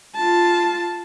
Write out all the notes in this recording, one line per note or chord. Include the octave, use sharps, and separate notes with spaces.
F4 A5